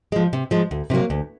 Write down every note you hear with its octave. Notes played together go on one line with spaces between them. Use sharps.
F3 G#3
C3
F3 G#3
D2
C3 D#3 F#3 A#3
D2